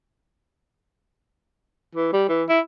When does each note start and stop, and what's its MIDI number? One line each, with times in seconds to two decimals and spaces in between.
1.95 2.10 52
2.13 2.26 55
2.29 2.44 52
2.49 2.60 64